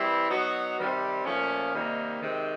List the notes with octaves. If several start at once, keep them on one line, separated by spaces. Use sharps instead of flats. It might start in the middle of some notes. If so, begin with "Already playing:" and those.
Already playing: E3 G3 C4 E4
F#3 B3 D#4 F#4
C3 D#3 G3 C4
A#2 F3 A3 C#4
C3 D#3 G3 A#3 D#4
C3 D#3 G#3 C4